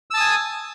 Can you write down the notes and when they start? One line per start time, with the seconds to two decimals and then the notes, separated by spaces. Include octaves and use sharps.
0.11 E6
0.14 A5
0.17 D#6
0.20 G#5